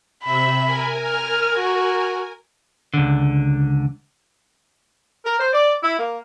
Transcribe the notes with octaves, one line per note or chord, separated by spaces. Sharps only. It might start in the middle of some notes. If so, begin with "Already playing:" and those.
C3 E5 B5
A#4 G#5
F6
F#4
C#2 D3
A#4
C5
D5
E4
A#3